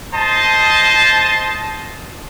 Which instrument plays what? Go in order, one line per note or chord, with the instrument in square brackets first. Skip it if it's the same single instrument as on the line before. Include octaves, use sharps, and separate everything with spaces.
[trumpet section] C5 D#5 A5